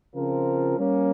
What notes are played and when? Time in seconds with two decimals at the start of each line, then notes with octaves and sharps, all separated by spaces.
0.14 C#3 F3 C4 F4 A#4
0.78 G3 A#3 C#4